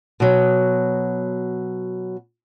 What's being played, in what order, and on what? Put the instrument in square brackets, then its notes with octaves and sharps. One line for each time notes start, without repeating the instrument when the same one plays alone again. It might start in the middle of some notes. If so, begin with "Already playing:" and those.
[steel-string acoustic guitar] B2 F#3